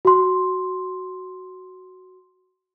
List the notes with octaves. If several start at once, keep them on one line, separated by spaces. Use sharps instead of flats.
F#4 C6